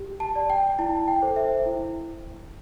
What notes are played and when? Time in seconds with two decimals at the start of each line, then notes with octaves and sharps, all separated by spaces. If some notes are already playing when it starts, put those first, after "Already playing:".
Already playing: G4
0.20 A5
0.35 D5
0.50 G5
0.79 E4 A5
1.08 G5
1.22 A4 C5
1.36 E5
1.66 E4